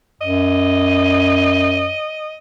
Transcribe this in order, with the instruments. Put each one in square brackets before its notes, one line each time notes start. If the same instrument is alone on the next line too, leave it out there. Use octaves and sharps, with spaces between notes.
[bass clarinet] F#2 [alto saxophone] D#5